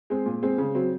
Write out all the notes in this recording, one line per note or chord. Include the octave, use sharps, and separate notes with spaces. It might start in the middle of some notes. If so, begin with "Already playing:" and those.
G#3 C4
A#2
G#3 C4
C#3
F#3 C4